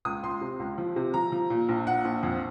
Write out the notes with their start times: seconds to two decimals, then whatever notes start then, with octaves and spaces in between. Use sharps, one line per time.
0.05 C#2 D#6
0.23 C#2 C6
0.41 C3
0.60 C#2
0.78 F3
0.96 C3
1.14 F3 A#5
1.32 F3
1.50 A#2
1.69 A#1
1.87 A#2 F#5
2.05 A#1
2.23 F2